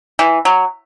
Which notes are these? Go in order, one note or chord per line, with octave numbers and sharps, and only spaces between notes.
E3
F#3